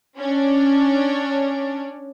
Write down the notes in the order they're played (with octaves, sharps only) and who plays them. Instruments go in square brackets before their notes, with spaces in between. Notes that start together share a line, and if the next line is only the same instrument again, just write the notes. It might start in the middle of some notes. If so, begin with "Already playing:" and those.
[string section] C#4 D4